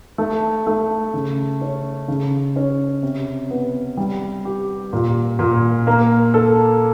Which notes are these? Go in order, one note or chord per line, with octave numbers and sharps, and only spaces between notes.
A3
A3
C#3
C#4
C#3
C#4
C3
B3
G3
G4
A#2
A#2
A#3
A4